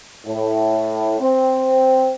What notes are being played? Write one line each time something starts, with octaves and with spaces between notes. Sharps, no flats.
A2
C4